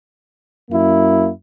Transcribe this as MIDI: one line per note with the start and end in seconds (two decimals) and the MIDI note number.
0.71 1.29 42
0.71 1.29 58
0.71 1.29 64